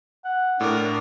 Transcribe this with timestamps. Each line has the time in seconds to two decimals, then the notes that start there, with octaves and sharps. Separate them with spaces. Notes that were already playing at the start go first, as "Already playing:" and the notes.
0.25 F#5
0.60 A2 D4 A#4